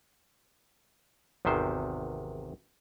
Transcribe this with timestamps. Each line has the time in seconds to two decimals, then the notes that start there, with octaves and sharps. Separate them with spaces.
1.45 G#1 E2 C3 D#3 C5